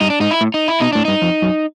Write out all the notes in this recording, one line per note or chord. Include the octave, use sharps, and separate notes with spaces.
G2 D#4
D4
G#2 D#4
E4
A2
D#4
E4
B2 D#4
A2 D4
G2 D#4
F2
F#2